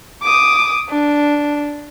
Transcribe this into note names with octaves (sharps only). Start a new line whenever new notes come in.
D6 D#6
D4